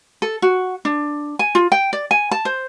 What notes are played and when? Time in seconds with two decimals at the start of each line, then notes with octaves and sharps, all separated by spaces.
0.22 A4
0.42 F#4
0.85 D4
1.39 G#5
1.55 F4
1.72 G5
1.93 D5
2.11 G#5
2.31 A5
2.45 C5